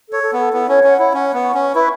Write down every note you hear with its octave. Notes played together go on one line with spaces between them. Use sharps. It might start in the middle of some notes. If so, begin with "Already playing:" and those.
A4 C#5
A4
B3
A4
B3 E4
C#4 C#5
C#4 F#5
E4 C#5
C#4 F#5
F#5
B3
C#6
C#4
C#6
E4 B4